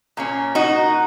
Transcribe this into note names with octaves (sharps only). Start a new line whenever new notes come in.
A#2 A#3 C#4
D#4 F#4